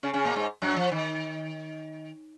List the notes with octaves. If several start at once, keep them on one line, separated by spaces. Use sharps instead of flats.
C#3 C#4
C#3 C#4
A#2 A#3
G#2 G#3
F#2 F#3
F3
D#3